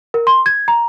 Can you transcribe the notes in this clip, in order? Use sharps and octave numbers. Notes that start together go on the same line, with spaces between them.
A#4
C6
G#6
A#5